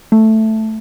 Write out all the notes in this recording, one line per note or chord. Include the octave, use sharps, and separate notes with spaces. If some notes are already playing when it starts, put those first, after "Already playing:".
A3